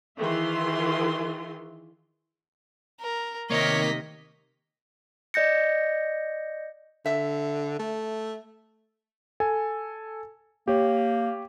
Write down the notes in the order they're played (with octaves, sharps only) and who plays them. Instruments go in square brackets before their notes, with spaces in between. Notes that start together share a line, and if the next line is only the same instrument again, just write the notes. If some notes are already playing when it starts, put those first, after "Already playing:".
[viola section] D#3 E3 F4 G#4 E5 C6
[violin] A#4
[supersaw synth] C3 D#3 [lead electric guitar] A#3 [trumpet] C#5 [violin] D#5 B6
[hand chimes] D5 D#5 G6 A#6 C#7
[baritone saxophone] D3 [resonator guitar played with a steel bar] E5
[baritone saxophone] A3
[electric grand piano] A4 G#5
[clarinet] A#3 [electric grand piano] G4 C#5